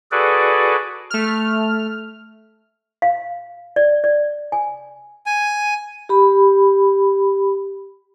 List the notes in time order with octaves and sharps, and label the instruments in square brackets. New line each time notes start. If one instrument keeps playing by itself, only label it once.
[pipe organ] F#4 G#4 A4 B4 D5
[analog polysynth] A3 F6
[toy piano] F5
D5
D5
G#5
[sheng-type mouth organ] G#5
[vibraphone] G4 B5